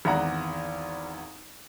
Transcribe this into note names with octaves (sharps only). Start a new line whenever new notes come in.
G#1 E2 F#5 A#5